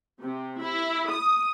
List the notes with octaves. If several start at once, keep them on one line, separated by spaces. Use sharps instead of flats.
C3
E4
D#6